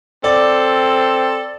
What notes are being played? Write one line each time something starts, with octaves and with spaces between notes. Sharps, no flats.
C4 A4 D5